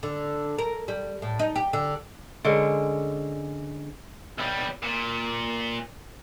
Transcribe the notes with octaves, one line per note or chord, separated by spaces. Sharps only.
D3
A#4
G3
A2
D#4
G4
D3
D3 G#3 C#4 A#4
B1 G3
A#2